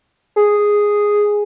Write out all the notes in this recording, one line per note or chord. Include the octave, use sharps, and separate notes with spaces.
G#4